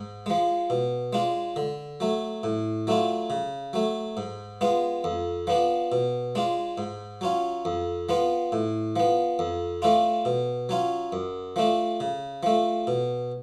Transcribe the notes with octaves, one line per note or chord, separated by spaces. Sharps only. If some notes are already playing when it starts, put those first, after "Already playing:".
Already playing: G#2
F3 G#3
B2
G#3 D4 F4
D3
F#3 A3
A2
F#3 A3 D4 F4
C#3
F#3 A3
G#2
G#3 B3 F4
F2
F3 B3 D4
B2
G#3 D4 F4
G#2
F#3 C#4 F4
F2
F3 B3 F4
A2
F3 B3
F2
F3 A3 D4 F4
B2
F#3 C#4 F4
F#2
F3 A3 D4
C#3
F3 A3
B2